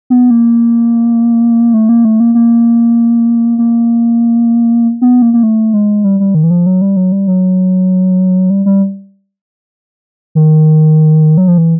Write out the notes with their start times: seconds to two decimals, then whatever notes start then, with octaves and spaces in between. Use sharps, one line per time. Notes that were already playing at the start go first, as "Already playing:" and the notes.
0.10 B3
0.31 A#3
1.74 A3
1.89 A#3
2.05 A3
2.20 A#3
2.35 A#3
3.58 A#3
5.02 B3
5.22 A#3
5.34 A#3
5.43 A3
5.74 G#3
6.04 G3
6.20 G3
6.35 D#3
6.43 E3
6.50 F3
6.66 F#3
6.81 G3
6.97 F#3
7.12 G3
7.28 F#3
8.50 G3
8.66 G3
10.35 D#3
11.37 F#3
11.48 F3
11.58 E3